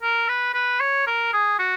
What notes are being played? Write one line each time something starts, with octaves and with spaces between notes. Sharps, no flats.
A#4
B4
B4
C#5
A#4
G#4
F#4